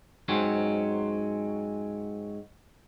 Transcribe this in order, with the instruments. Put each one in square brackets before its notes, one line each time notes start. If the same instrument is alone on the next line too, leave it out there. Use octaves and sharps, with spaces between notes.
[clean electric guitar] G#2 F#3 C4 C#4